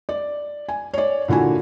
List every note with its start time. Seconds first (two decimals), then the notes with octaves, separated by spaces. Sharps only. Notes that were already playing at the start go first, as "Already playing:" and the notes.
0.09 D5
0.69 G#5
0.94 C#5 D5
1.28 A#2 D3 E4 F#4 G#5